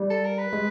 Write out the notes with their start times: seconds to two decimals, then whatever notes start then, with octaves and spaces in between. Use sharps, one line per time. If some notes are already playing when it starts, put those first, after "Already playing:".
Already playing: G3
0.10 A4
0.24 A#4
0.39 B4
0.53 G#3